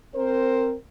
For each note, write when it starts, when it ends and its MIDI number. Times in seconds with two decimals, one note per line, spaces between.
0.15 0.74 60
0.15 0.74 70
0.15 0.74 72